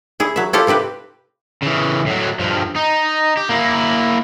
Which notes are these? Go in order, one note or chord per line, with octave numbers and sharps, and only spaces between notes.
E4 G#4
F#3 E5
E4 F4 G4 A4 C5 F5
C3 C4 G4 B4
C#3 E3
A2 F#3
G2 F3
D#4
G4
A#3 E4